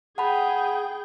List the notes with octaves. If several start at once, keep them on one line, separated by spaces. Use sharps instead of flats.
G#4 F#5 G5 A5 B5